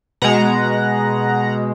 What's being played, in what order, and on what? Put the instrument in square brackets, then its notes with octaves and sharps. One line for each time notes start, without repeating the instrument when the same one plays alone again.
[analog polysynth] B2 G#3 F#5 A#5